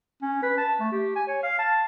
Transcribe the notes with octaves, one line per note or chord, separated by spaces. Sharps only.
C#4
B4
A5
A3
G4
G#5
C#5
F5
A5